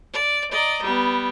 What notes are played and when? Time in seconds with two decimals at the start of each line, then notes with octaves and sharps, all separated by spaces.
0.13 D5
0.51 D5 D#5 A#5
0.83 G3 B3